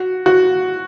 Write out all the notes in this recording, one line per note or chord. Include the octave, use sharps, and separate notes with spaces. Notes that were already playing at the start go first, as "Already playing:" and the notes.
Already playing: F#4
F#4